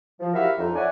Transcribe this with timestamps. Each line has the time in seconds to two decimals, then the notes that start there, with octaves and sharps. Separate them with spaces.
0.20 F3
0.34 E4 F#4 G4 A#4 E5 F5
0.58 F2 D#4
0.76 C#5 D5 E5 F#5 G#5